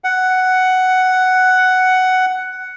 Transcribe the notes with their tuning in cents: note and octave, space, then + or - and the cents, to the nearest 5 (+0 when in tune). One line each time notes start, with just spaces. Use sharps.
F#5 +5